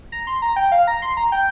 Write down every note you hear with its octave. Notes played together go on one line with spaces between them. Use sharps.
A#5
C6
A#5
G5
F5
A#5
C6
A#5
G5